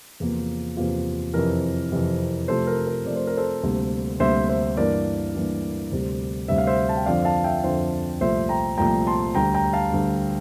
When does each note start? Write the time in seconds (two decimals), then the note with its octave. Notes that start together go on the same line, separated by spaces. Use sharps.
0.20 E2 C3 F3 A#3 F4
0.77 E2 C3 F3 A#3 F4
1.34 F2 C3 E3 A#4
1.92 F2 C3 E3
2.48 C3 F3 A3 A4 C5
2.67 A#4
2.87 A#4
3.05 C3 F3 A3 D5
3.16 C5
3.27 A#4
3.37 A4 C5
3.63 D2 C3 G3 A#3
4.20 D2 C3 G3 A#3 C5 E5
4.49 C5 E5
4.77 G2 E3 A#3 D4 A#4 D5
5.34 G2 E3 A#3 D4
5.92 D2 C3 G3
6.48 D2 C3 G3 E5
6.58 F5
6.67 C5 E5
6.89 A5
6.97 G5
7.06 F2 D3 F3 C4 D5 F5
7.25 F5 A5
7.44 E5 G5
7.63 F2 D3 F3 C4 C5 E5
8.21 C2 A#2 F3 A3 C5 E5
8.49 G5 A#5
8.78 C2 A#2 F3 A3 G5 A#5
9.07 A5 C6
9.35 D2 D3 G3 G5 A#5
9.54 G5 A#5
9.73 F5 A5
9.92 D2 D3 G3